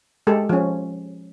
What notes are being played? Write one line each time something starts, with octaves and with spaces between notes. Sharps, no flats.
G#3 G4 A4
F3 C#4